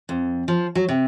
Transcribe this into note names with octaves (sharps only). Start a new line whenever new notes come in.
F2
F3
F#3
C3